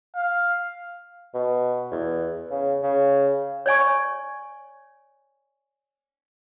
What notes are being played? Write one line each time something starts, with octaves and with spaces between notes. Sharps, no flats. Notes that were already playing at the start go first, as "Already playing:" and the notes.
F5
B2
E2
C#3
C#3
C#5 D5 G#5 C#6